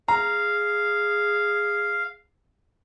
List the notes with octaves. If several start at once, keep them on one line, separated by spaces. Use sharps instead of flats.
G#4 F5 A#5